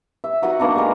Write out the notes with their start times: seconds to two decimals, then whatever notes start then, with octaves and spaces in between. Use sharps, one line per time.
0.24 E5
0.42 D#4 F#4 D#5 F#5
0.60 A#3 B3 D4 D#4
0.75 G#3 A#4